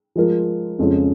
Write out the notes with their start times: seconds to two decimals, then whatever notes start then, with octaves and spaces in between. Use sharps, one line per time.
0.16 F3 G#3 F4 A#4
0.79 F2 C#3 G#3 C#4 F4